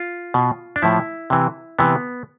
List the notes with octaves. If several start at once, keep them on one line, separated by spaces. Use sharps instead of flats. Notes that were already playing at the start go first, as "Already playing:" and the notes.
Already playing: F4
B2
D4
A2 F3 E4
C3 E3
C3 E3 B3